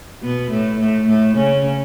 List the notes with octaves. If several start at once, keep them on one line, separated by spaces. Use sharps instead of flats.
B2 B3
A2 A3
A2 A3
A2 A3
C#3 C#4